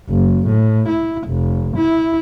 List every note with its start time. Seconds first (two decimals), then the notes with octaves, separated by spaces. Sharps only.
0.10 F#1
0.48 A2
0.89 E4
1.28 F1
1.77 E4